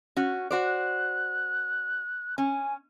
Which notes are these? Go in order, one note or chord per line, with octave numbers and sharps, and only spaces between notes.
C#4 F#4
F#4 C5 D5 F#6
C#4 G#5